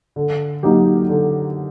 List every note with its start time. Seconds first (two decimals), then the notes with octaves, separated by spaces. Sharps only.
0.16 D3
0.63 F#3 A#3 D#4 G4
1.09 D3